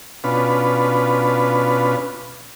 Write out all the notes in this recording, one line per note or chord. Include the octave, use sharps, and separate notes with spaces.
B2 C#4 D4 F4 B4